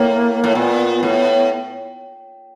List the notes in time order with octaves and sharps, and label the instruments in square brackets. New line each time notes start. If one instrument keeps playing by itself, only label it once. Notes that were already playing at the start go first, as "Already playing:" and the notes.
Already playing: [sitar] A2 [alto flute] A#3
[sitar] A2
[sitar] A#2 [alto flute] B3
[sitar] A2